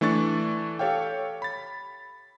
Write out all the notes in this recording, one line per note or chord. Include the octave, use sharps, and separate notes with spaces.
E3 A3 D4 C#6 A6
G4 A4 C#5 F5 G5
B5 A6